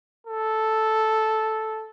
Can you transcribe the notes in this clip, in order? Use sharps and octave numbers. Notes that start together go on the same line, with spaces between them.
A4